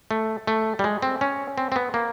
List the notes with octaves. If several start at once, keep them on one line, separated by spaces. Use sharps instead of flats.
A3
A3
G3
G#3
C4
C#4
C4
C4
B3
A#3